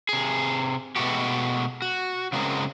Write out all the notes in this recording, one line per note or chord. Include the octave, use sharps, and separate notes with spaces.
C3 G#4
B2 G#3 A3 F#4 G4
F#4
C#3 F#3 G#3 C4 A#4